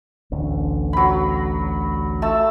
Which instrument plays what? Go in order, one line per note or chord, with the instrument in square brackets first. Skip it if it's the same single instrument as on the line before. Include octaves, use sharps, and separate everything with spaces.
[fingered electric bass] A1 D2 D3
[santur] F#3 B5
A3 A5 E6